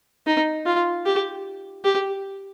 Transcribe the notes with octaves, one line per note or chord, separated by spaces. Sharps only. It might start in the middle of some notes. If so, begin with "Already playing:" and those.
D#4
F4
G4
G4